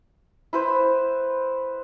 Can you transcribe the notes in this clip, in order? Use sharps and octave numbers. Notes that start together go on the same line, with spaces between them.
E4 B4 C5